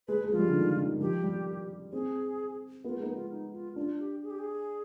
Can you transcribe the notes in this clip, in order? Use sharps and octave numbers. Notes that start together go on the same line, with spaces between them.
G#3 B4
G#3
F3 F4
G3
D3
D#3
D#3
D#3
F3 G4
G3
C4 G#4
B3 F4
G#3
B3 D#4
F4
D#4
F4
D4 F4
G4
G#4
G4
G#4